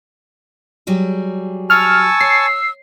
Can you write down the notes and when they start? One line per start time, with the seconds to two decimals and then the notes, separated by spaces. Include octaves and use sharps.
0.87 F#3 G3 G#4
1.70 G#5 A5 C#6 E6 F6
2.21 C#5 C7